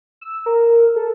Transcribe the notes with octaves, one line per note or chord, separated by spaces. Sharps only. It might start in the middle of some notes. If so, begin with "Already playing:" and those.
E6
A#4
A4